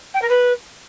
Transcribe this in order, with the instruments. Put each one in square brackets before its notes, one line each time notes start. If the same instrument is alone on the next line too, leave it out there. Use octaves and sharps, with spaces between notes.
[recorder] G5
A#4
B4